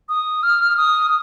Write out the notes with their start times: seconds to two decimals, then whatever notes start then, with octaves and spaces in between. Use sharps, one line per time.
0.09 D#6
0.43 F6
0.77 D#6